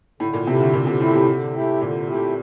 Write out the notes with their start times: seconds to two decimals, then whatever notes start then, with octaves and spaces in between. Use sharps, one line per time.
0.20 A2 D3
0.33 A#2
0.47 C3 A3 E4 G4
0.60 D3
0.73 A#2 D3
0.87 C3
1.00 A2 A3 E4 G4
1.14 C3
1.27 D3
1.54 A3 E4 G4
1.81 A#2 D3
2.08 A3 E4 G4